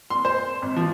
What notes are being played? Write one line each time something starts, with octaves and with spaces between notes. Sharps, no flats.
C6
C5
G#1
F3